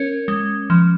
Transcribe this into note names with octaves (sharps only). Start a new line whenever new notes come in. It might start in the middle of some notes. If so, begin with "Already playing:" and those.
Already playing: C#4 A#4 C#5
G#3
F3